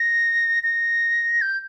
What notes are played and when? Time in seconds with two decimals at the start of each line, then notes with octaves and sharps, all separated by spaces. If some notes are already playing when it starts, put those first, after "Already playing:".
Already playing: A#6
0.63 A#6
1.42 G6